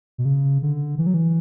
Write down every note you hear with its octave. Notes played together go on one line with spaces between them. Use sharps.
B2
C#3
D3
E3
F#3
E3